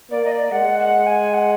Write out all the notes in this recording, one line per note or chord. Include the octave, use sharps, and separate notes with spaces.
A#3 D5
D#5
D5
G#3 F#5
F#5
G#5
F#5